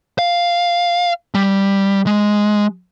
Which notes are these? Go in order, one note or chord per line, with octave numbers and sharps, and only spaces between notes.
F5
G3
G#3